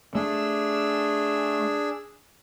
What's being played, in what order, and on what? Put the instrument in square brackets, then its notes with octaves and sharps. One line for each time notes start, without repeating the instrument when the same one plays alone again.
[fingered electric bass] A3 [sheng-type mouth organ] D4 G#4 E6